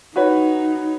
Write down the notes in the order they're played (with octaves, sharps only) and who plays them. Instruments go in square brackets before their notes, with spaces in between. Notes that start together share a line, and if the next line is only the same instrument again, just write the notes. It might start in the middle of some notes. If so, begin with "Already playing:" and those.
[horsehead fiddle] D#4 [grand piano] F#4 B4 C#5